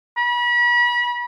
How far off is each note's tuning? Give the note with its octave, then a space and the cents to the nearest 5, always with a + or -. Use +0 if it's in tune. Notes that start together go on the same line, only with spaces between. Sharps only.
B5 -35